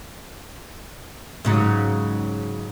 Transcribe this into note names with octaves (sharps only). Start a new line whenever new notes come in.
G#2 C#3 F#3